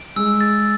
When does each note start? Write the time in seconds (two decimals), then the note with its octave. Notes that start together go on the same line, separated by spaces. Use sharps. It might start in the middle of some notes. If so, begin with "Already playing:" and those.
Already playing: D7
0.16 G#3 E6
0.41 A6